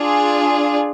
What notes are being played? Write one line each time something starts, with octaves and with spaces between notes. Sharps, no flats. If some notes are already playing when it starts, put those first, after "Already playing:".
Already playing: D4 F4 G#4